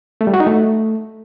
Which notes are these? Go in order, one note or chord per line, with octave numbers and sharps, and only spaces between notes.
A3
G3
F#4
D#4
A3